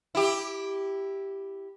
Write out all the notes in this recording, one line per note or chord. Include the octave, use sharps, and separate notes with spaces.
E4 G4